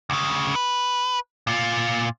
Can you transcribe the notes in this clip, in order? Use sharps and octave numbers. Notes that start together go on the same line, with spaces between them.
D2 C#3
B4
A#2 F4